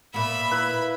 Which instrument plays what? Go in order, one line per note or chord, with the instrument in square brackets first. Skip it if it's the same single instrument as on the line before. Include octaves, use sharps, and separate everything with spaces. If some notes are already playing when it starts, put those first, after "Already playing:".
[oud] A#2 B3 [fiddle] E5 B5
[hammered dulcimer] E4 B4